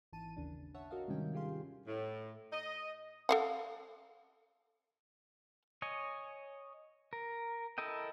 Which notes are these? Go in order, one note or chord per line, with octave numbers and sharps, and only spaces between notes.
G#1 E3 A5 D#7
D#2 C#3 D4
C#5 E5 F#5 A5
F#4 A#4 D#5 F5
G#2 C3 D#3 G3 C#4 G5
C#4 F4 G4 G#4 F5 C6
A2
D#5
A4 F5 F#5
C#5 D#5 G#5
A#4
E4 A4 A#4 D#5 G5